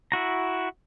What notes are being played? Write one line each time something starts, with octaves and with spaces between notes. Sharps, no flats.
E4 F#4 A#5